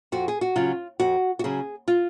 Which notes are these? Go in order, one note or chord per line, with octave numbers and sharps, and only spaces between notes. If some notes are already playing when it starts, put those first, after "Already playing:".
F2 F#4
G#4
F#4
C#3 F#3 F4
F2 F#4
F#4
C#3 F#3 G#4
F4